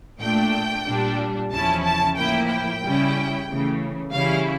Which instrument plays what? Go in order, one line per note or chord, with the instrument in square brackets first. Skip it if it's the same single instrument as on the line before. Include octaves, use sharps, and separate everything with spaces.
[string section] A#2 A3 D4 G5
A#2 G3 D4
E2 C#3 F3 C#4 E4 A5
A5
A2 F3 A#3 E4 G5
G5
C#3 G3 C#4 E4
C#3 E3 A3
C#3 E3 G3 C#4 E4 F5